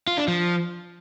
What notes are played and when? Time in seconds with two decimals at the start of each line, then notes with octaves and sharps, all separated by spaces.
0.07 F4
0.18 D4
0.28 F3